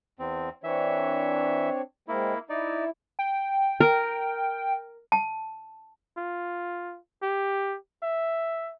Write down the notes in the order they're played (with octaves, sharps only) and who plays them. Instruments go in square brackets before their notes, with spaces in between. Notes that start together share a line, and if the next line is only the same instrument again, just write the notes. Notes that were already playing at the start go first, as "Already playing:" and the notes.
[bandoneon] E2 C4
[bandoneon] E3 E5 [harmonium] C4 D4 C#5
[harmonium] G#3 C4 [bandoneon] A#3 E4
[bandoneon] D#4 D5 [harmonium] E4
[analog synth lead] G5
[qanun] A#4
[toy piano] A5
[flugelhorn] F4
G4
E5